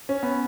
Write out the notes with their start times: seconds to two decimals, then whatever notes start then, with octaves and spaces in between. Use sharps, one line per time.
0.09 C#4
0.23 B3